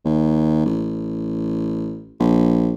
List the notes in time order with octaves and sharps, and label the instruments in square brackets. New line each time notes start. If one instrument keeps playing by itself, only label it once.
[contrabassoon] D#2
A1
A#1